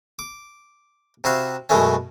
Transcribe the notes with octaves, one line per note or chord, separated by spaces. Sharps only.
D6
C3 E4 F#4 F5
F#2 B2 E3 G#3 A3 C#4